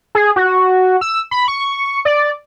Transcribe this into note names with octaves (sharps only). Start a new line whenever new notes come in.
G#4
F#4
E6
B5
C#6
D5